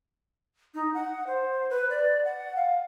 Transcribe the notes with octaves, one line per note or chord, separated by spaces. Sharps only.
D#4
F#5
C5
B4
D5
F#5
F5